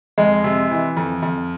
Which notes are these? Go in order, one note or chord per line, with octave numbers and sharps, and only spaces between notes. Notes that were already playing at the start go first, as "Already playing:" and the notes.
F2 G#3
C3
E3
F2
F2